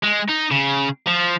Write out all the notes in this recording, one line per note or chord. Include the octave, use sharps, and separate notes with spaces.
G#3
D#4
C#3
F3